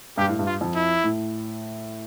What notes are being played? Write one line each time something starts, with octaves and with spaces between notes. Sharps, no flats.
G2 G4
A2
G2
F4
F2
E4
A2